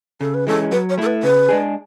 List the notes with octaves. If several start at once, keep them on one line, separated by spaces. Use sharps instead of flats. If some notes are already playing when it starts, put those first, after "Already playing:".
C#3 A4
B4
E3 G#3 C#4 A4
F#3 B4
C#5
A3 E4 A4
B4
C#3 B4
G#3 D4 G#4